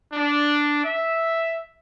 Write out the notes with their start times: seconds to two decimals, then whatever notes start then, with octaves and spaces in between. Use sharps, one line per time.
0.12 D4
0.83 E5